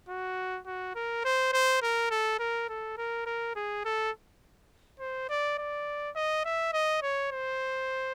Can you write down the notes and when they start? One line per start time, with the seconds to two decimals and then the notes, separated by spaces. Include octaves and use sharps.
0.09 F#4
0.66 F#4
0.95 A#4
1.24 C5
1.53 C5
1.82 A#4
2.11 A4
2.39 A#4
2.69 A4
2.97 A#4
3.26 A#4
3.55 G#4
3.85 A4
4.99 C5
5.29 D5
5.58 D5
6.15 D#5
6.45 E5
6.73 D#5
7.02 C#5
7.31 C5